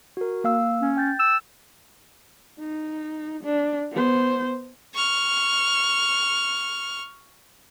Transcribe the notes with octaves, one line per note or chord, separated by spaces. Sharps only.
F#4 A#4
A#3 F5 E6
C#4
G5 G6 A6
E6
D#4
D4
B3 C5
C#6 F6